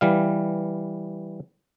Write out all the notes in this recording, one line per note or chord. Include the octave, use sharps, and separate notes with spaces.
E3 G3 F5